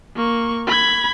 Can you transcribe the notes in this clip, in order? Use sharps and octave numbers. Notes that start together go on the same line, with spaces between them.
A#3 C#6
B5 G#6